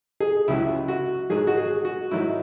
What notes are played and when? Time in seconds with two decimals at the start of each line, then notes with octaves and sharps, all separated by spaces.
0.20 G#4
0.48 C#2 C#3 F#3 E4
0.88 F#4
1.30 G#2 D#3 F#3 G#4
1.47 F#4
1.57 G#4
1.85 F#4
2.11 G#2 D#3 F#3 E4